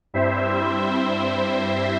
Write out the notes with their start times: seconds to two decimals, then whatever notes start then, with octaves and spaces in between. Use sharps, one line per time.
0.14 G2 G3 C4 E4 C5 E5
0.96 C5 E5